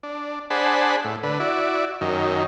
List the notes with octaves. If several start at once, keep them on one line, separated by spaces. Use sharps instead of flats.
D4
D4 G#4 C5 F#5 A5 B5
A2
D3 B4
E4 F#4 D5
F#2 D#3